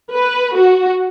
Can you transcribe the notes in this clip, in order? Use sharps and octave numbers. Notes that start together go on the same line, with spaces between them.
B4
F#4